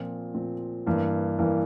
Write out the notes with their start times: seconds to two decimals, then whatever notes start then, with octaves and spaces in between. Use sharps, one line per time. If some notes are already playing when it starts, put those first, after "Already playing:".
Already playing: A#2 F3 C4
0.34 A#2 F3 C4
0.86 G2 E3 A#3
1.38 G2 E3 A#3